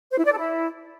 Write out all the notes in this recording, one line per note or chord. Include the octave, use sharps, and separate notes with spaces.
C5
E4
D5
A4
E4